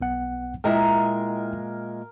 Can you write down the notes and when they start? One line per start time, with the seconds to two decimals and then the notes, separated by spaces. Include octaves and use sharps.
0.01 B1 B3 F#5
0.64 A#2 G#3 E4 A#4 D#5 E5 G5